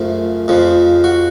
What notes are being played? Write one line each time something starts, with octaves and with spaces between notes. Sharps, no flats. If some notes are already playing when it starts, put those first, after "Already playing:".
Already playing: F#2 C#3 F3 A3
F2 C#3 F3
F#4